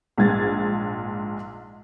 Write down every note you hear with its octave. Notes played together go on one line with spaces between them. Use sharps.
A#1 G#2 G#6 A6